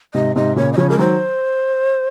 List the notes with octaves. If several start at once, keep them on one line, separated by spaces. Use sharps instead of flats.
G#2 C3 D#5
G#2 C3 D#5
A#2 C#3 C#5
D#5
C#3 F3 C#5
G#3 A#4
D#3 F#3 C5